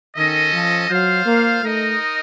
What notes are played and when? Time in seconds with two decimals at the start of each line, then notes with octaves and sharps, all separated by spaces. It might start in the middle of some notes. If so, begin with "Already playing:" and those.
0.16 D#3 C#4 A4 D#5
0.52 F3
0.89 F#3 F4 C5 F5
1.25 A#3
1.62 A3 D#4 A#4 D#5